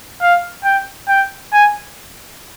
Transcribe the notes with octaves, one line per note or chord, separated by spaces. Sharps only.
F5
G5
G5
G#5